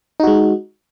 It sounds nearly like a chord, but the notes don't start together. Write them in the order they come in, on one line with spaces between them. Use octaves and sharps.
D#4 F#4 G#3